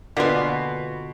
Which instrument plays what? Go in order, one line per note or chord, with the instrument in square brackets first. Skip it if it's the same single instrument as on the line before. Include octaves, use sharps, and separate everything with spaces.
[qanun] B2 F4 G#5 [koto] D3 [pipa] A#3 B3 [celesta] C6 B6